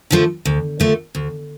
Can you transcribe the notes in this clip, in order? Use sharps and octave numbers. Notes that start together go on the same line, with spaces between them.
D3 F3 A3
D2
D3 F3 A3
D2